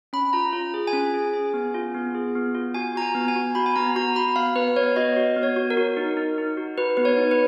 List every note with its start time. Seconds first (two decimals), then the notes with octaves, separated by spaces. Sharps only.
0.13 C#4 B5
0.33 F4 A#5
0.53 F4
0.74 G#4
0.87 G#5
0.93 C#4
1.14 G#4
1.33 G#4
1.54 B3
1.74 F4
1.94 B3
2.15 G#4
2.35 B3
2.54 F4
2.74 F#4 G#5
2.96 F#4 A#5
3.02 G#5
3.15 B3
3.28 G#5
3.36 F#4
3.55 F#4 B5
3.66 G#5
3.76 B3 A#5
3.96 F#4 A#5
4.16 F#4 B5
4.36 B3 F5
4.56 B3 B4
4.76 B3 C#5
4.96 F#4 D#5
5.16 F#4
5.36 B3
5.43 C#5
5.56 F#4
5.70 A#4
5.77 F#4
5.97 D#4
6.17 D#4
6.38 D#4
6.57 F#4
6.78 F#4 B4
6.97 B3 B4
7.05 C#5
7.17 D#4
7.31 B4